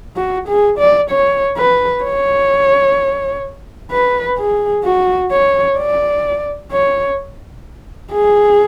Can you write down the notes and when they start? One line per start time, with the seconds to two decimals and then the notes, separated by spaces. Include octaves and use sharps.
0.16 F#4
0.48 G#4
0.79 D5
1.10 C#5
1.57 B4
2.04 C#5
3.91 B4
4.38 G#4
4.84 F#4
5.31 C#5
5.78 D5
6.72 C#5
8.12 G#4